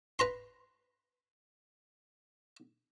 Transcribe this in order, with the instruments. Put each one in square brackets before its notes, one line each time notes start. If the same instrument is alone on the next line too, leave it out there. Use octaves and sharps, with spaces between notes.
[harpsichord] B4 A#5 C6